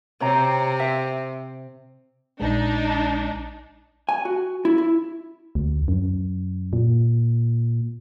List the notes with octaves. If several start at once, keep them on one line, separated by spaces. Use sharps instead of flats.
C3 C4 C#5 A#5
E5
A#1 G#3 D4 D#4
G#5
F#4
E4
E4
D2
F#2
A#2